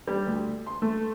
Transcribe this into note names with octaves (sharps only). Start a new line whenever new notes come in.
G3
D2
C6
A3